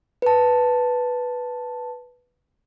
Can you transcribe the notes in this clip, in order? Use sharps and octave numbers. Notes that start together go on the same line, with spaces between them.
B4 A5